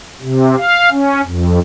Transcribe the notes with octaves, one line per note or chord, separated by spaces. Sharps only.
C3
F5
C#4
F2